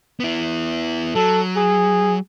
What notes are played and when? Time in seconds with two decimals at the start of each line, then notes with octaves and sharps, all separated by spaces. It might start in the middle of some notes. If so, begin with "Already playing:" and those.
0.20 B3 E4
1.15 F#3 A4
1.56 G#4